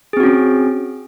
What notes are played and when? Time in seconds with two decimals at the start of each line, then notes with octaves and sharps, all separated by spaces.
0.13 G#4
0.17 C4
0.20 F#4
0.23 C#4